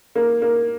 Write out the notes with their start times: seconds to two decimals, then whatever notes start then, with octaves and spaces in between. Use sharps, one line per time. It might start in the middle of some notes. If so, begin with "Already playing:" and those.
0.15 A#3
0.42 A#3